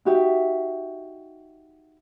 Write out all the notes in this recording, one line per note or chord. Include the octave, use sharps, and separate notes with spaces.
D#4 F#4 G4 E5